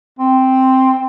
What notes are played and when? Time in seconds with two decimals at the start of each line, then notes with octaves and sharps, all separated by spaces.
0.19 C4